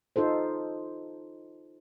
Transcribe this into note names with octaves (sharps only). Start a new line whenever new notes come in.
D#4 F4 A4 C5